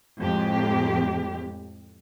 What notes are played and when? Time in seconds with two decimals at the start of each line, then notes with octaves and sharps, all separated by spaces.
0.19 F2 A2 G#3 G4